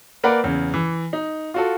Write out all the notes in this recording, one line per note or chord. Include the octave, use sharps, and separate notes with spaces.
A#3 A#4 B4 D5 F#5
E2 C#3
E3
D#4
F4 F#4 A4